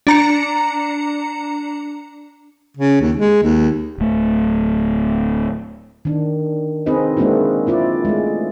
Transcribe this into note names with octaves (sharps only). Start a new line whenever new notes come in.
D4 A#5 C#7
C#3
D#2
G#3
D#2
D1 A3
D#3 D4
C4 D#4 G#4 B4 D#5
G#3 A#3 C4 D4 E4 F#4
C4 E4 F4 D5
G#3 A3